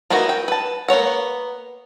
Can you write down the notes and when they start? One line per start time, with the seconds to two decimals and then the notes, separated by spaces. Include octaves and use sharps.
0.10 A#3 B3 D#4 E4 F#4
0.29 G5
0.48 B4 A5
0.88 A#3 B3 C#5 F#5